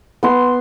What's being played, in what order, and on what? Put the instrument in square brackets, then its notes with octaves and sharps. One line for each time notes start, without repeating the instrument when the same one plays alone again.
[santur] B3 C6